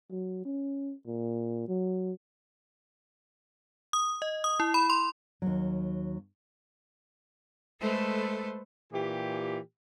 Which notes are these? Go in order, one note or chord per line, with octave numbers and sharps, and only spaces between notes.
F#3
C#4
A#2
F#3
D#6
D#5
D#6
E4
B5
C6
D#2 F#3
G#3 A3 A4 B4 C5
A#2 E3 G4